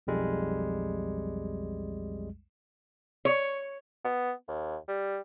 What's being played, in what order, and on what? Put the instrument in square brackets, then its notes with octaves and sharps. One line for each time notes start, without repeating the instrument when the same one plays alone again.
[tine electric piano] B1 F2 G3 G#3
[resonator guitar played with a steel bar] C#5
[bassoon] B3
D#2
G3